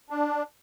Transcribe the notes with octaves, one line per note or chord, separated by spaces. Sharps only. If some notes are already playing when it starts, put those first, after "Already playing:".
D4